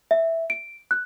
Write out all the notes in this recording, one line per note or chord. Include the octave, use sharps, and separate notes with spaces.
E5
D7
F#6